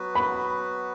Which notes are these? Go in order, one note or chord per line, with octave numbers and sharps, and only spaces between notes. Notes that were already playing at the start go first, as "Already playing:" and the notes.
Already playing: F#3 B3 F#4 B4
B5